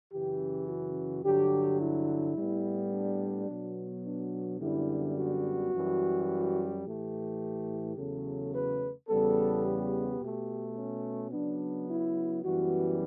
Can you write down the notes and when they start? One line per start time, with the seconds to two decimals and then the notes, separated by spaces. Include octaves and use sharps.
0.12 F#2 C#3 E3 G4
0.68 F#4
1.24 G2 D3 F#3 G4
1.81 E4
2.37 A2 G3 B3
2.93 D4
3.48 B2 F#3 B3
4.04 D4
4.60 F#2 D3 G3 B3 E4
5.16 F#4
5.72 F#2 E3 G3
6.84 A2 E3 A3 G4
7.96 E2 C#3 F#3 A3 A4
8.52 B4
9.08 E2 C#3 G3 B3 A4
9.64 G4
10.20 B2 A3
10.77 C#4
11.32 C#3 F#3 B3 D4
11.88 E4
12.44 F#2 E3 G3 B3 F#4